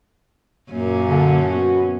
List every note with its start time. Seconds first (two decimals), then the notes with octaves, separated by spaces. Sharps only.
0.71 F#2 A#2 A#3 C#4
1.09 D3
1.52 B3 F#4